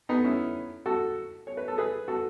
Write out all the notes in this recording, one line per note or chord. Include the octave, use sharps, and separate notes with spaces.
B3 D#4
C#4 E4
F#4 A4
C#5
B4
A4
G#4 B4
F#4 A4